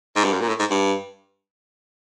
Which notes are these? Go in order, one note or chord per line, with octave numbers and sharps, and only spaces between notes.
G#2
G2
F#2
A#2
A2
G#2
G2